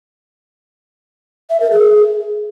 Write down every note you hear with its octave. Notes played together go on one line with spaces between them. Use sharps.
E5
A#4
G#4